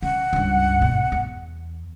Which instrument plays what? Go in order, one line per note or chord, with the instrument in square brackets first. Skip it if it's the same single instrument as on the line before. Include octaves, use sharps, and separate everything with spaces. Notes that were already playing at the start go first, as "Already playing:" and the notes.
[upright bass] C#3 [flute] F#5
[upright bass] C#2 G2
G#1 B2
E2